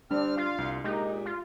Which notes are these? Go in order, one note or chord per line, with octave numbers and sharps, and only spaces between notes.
G3 C4 D4 F6
F4 F5
C2
A#2 G#3 D#4 G4
F4